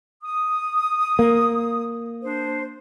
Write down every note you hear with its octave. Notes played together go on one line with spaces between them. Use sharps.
D#6
A#3
D4 C5